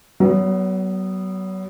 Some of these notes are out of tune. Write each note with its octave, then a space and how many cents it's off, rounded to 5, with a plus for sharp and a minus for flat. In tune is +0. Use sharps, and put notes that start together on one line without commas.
F#3 +35 B3 +0